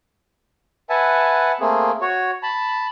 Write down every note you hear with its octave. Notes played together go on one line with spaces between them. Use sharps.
B4 E5 F#5 G#5 A5
A3 A#3 C4 G#4
F#4 C#5
A5 B5